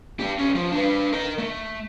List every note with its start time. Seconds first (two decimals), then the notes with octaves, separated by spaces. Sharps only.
0.20 G2 G4
0.38 B1 C#4
0.55 F3
0.72 D4 B4
1.13 A#4 D#5
1.38 A3